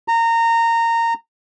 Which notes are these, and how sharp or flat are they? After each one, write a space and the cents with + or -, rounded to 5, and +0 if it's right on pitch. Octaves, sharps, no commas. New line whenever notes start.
A#5 -20